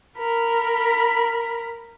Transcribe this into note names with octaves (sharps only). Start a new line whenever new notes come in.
A#4 B5